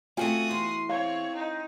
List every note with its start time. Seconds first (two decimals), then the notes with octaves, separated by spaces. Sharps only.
0.17 A3 C4 C#4 F4 F#4 G5 G#5 D#6
0.51 E2 C6
0.89 C4 C#5 F5
1.36 D#4